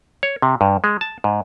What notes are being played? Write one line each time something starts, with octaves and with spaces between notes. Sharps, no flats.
C#5
C3
G2
G#3
A5
G#2